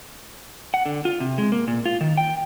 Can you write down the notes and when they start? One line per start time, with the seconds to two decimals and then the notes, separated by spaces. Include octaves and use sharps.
0.74 F#5
0.86 D3
1.05 F4
1.20 C3
1.38 G#3
1.52 A#3
1.68 A#2
1.86 F4
2.01 D#3
2.17 G5